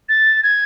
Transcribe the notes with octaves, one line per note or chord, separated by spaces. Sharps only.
A6
G#6